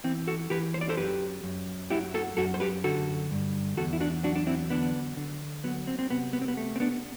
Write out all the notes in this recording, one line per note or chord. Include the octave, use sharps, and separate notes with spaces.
E3 C4
F#4 A4
E3 G4 B4
C5
D5
A4 C5
F#2 G4 B4
F#2
F#3 E4 G4
F#4 A4
F#2 F#4 A4
C5
G4 B4
D3 F#4 A4
G2
E2 F#4 A4
E4
D4 F#4
F#3 D4 F#4
D4
C4 E4
D3 B3 D4
D3
F#3 B3
C4
C4
C3 B3
B3
C4
B3
A3
C4
B3 D4